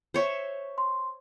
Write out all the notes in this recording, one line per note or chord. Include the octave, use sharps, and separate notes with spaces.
C5 C#5 E5
C6